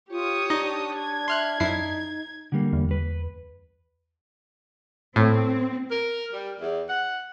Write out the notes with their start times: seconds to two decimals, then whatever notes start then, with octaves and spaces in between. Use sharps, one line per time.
0.11 F4 G4 C#5 D#6
0.50 D4 D#4 D5 D#5
0.97 G#6
1.28 E5 C6 F6 F#6
1.60 F#2 D#4 E4 C7
2.52 D3 G3 A#3
2.73 E2
2.91 B4
5.16 A2 C4
5.91 A#4
6.33 G3
6.60 E2
6.89 F#5